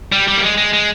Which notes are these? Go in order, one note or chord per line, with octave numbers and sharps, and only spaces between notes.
G3
G3
A#3
G#3
G#3
G#3